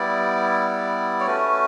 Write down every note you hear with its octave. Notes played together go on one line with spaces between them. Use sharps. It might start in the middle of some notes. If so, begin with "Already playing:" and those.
Already playing: G3 B3 E4 D5
C#5
A3 C#4 F#4 B4